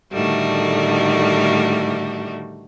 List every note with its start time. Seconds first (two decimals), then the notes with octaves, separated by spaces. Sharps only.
0.13 A2 D3 D#3 G3 A3 F#4